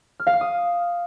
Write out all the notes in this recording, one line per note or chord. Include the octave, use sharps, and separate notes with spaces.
F6
F5
F6
D#6